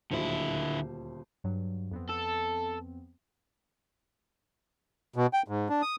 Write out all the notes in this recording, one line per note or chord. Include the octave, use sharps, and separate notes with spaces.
D#1 D2 D3 E4 C5
G2 F#3
F2 B3 C4
A4
B2
G5
G#2
D4
D#6